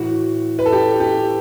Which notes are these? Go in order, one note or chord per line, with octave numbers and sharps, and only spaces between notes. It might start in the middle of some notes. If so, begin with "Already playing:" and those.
Already playing: A2 E3 F#4
B4
A4
G4
G4